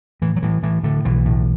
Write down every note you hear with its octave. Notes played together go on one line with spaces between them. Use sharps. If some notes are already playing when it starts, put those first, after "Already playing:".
A2 E3
F#3
A2 E3
A2 E3
A2 D3
B1 E3
A2